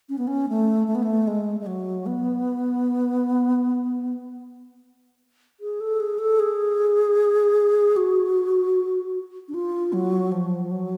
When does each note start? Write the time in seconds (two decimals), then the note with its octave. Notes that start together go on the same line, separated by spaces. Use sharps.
0.09 C#4
0.18 B3
0.27 C#4
0.49 A3
0.87 A3
0.95 B3
1.03 A3
1.27 G#3
1.60 G#3
1.66 F#3
2.06 B3
5.60 G#4
5.80 A4
6.00 G#4
6.19 A4
6.39 G#4
7.96 F#4
9.48 D4
9.54 F4
9.93 F#3
10.32 F3
10.71 F#3